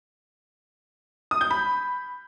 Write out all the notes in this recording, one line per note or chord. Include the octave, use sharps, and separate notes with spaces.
D#6
G6
B5